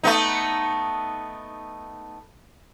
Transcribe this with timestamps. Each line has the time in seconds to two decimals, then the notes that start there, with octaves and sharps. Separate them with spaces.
0.03 A3 B3 D#4